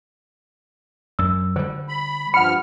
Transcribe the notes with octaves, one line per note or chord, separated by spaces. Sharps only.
F#2 E6
D3 G3 C5
B5
G2 F3 F#5 B5 F6 C#7